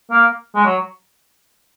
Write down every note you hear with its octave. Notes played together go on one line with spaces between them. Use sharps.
A#3
G#3
F#3